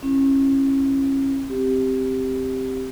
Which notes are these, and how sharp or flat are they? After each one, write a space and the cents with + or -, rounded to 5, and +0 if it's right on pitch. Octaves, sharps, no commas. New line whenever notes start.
C#4 -30 E4 +10
C4 +0 G4 +0